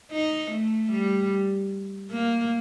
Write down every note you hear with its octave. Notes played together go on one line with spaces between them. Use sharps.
D#4
A3
G3
A#3